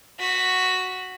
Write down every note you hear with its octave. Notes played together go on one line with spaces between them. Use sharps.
F#4 B6